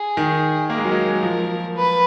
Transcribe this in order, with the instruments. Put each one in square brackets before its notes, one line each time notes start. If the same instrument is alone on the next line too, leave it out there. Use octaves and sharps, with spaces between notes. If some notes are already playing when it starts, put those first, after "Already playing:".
Already playing: [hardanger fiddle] G#4
[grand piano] D#3
[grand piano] A#3 [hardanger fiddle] A#4
[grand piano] G#3
F#3
G#3
F3
[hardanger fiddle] B4